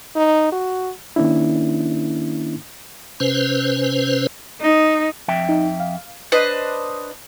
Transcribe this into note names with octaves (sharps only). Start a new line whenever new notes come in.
D#4
F#4
D#3 A#3 C#4 D4 E4
C3 C#4 B4 C5
D#4
F2 E5 G5
D#4
F5
D4 B4 C5 D#5